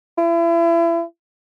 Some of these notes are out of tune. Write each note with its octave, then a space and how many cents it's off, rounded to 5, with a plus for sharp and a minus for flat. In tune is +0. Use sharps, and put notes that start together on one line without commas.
E4 +35